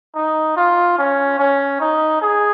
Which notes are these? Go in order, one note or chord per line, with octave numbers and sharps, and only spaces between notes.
D#4
F4
C#4
C#4
D#4
G#4